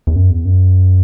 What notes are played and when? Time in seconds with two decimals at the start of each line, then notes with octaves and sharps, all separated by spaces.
0.07 E2
0.16 F#2
0.31 E2
0.45 F#2